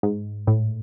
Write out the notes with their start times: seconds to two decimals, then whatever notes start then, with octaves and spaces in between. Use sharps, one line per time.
0.03 G#2
0.47 A2